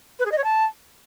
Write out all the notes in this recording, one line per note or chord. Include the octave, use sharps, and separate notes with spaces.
B4
G#4
D#5
C#5
A5